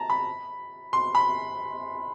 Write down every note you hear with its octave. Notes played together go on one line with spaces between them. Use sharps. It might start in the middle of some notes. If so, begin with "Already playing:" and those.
Already playing: A5 A#5
B5
C6
B5